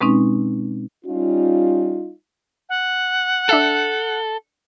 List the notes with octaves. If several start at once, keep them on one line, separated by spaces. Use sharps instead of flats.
B2 G#3 C4 C#4 D#4
G3 C#4 D#4 F4
F#5
D4 A4 E5 E6